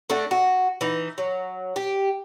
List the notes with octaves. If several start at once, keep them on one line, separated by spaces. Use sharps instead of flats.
A3 D4 F#4
F#4
E3 D#4
F#3
G4